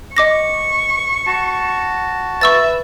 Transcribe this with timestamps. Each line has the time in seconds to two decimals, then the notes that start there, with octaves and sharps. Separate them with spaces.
0.17 D#5 C#6 D6 A#6
1.26 F#4 A5
2.41 B4 E5 C#6 E6 A6